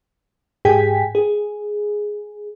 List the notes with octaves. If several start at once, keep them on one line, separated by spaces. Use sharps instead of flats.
G#2 G4 G#4 G5 G#5 B6
G#4